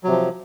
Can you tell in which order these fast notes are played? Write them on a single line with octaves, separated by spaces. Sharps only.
F#3 C3 F3